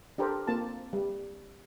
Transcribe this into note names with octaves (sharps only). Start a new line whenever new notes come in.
D4 G4 A4 A#4 C5 D5
A#3 C4 F4 A5
G3